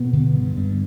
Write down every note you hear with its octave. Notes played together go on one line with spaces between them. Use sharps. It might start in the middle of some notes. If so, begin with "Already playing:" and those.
Already playing: B2 B3
D3
G2
G2